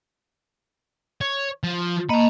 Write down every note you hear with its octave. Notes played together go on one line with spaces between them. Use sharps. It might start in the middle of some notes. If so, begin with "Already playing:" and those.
C#5
F3
A#3 D#5 A5 B5